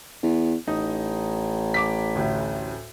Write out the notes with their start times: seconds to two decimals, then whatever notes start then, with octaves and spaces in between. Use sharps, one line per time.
0.23 E2
0.68 A1 D#4
1.74 D6 B6
2.16 D2 A2